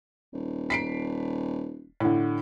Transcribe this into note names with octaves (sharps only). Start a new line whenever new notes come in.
D#1
B6 C7 D7
A2 D3